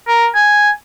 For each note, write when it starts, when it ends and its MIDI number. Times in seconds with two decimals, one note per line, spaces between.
0.08 0.26 70
0.35 0.70 80